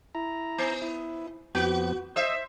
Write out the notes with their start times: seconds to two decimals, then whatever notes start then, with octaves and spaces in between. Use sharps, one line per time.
0.15 E4 A#5
0.58 B3
0.82 E4
1.55 F2 B3 F#4
2.16 C5 D#5 E5 E6